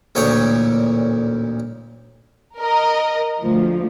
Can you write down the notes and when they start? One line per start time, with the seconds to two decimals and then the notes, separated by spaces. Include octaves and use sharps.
0.15 A1 D2 A#2 C#5 G5 D#6
2.59 A#4 D#5
3.40 D2 F3